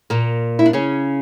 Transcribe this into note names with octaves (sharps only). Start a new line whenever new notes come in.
A#2 A#3
E4
D4
C#3 C#4